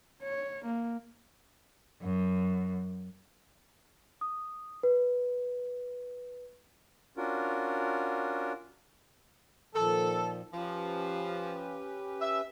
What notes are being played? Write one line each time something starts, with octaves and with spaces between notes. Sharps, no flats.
C#5
A#3
F#2
D#6
B4
C#4 D4 F4 F#4 A#4
A#2 D#3 F3 A4
F3 C#4 G4 B4
E5